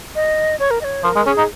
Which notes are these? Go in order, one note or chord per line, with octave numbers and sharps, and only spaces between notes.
D#5
C#5
A#4
D#5
C#5
F3 A#4
G#3
C#4 G#4
D#4